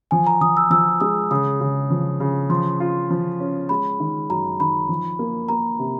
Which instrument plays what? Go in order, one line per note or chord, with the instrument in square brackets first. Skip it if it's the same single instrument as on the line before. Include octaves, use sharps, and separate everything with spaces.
[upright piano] F3 [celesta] G#5
[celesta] A#5
[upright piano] F3 [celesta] D#6
[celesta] E6
[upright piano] F3 [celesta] E6
[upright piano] G#3 [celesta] D#6
[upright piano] C#3 [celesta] D#6
[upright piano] C#3
F3
C#3
[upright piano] F3 [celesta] C6
[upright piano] F4
F3
C#4
[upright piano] G#3 [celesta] B5
[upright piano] D#3
[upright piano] F#2 [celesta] A#5
[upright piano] D#3 [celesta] B5
[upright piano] F3
A#3
[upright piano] A#3 [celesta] A#5
[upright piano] C3